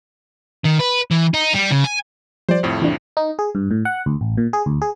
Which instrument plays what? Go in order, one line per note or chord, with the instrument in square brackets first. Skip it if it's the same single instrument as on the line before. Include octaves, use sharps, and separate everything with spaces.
[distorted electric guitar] D#3
B4
E3
D#4
G3
C#3
G#5
[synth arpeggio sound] F3 G3 [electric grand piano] C5 D5
[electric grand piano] C2 F2 A2
[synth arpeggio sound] E3 D4
[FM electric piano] D#4
G#4
G2
A2
F#5
D2
A1
A#2
G#4
D2
G#4